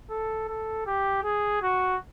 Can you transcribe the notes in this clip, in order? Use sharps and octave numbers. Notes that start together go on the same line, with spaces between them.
A4
A4
G4
G#4
F#4